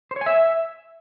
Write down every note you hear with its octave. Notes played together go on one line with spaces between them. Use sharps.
C5
C#5
G#5
E5